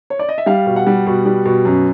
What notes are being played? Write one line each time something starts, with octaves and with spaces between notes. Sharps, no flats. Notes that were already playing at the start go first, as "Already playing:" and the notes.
C#5
D5
D#5
E5
G3 F5
B2
F#5
G3
B2
G3
B2
F#2